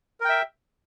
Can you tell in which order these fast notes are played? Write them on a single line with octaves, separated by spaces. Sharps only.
A#4 G5 E5